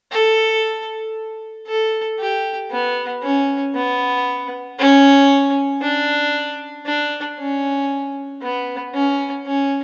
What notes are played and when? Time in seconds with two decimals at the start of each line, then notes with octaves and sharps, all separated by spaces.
0.12 A4
1.67 A4
2.19 G4
2.71 B3
3.23 C#4
3.75 B3
4.79 C#4
5.82 D4
6.86 D4
7.39 C#4
8.42 B3
8.94 C#4
9.46 C#4